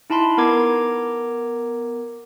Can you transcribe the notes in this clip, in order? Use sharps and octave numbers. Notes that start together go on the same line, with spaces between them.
D#4 E4 A5 B5 C6
B3 A#4 A#5 D6 G#6